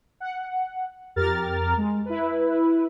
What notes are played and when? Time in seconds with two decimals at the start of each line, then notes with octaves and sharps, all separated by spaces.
0.20 F#5
1.16 F2 G4 A#4 F6 A6
1.78 G#3
2.06 E4 B4